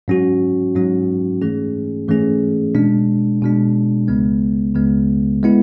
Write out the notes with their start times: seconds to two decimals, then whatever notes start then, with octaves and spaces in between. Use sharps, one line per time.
0.08 G#2 F#3 C#4 F#4
0.76 G#2 F#3 C#4 F#4
1.42 G#2 E3 A3 C#4 G#4
2.08 G#2 E3 A3 C#4 G#4
2.75 B2 G#3 D4
3.42 B2 G#3 D4
4.08 C#2 C#3 G#3 B3
4.75 C#2 C#3 G#3 B3
5.43 G#3 B3 E4